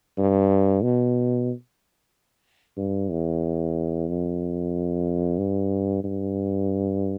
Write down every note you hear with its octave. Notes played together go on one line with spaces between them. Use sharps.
G2
B2
G2
E2
F2
G2
G2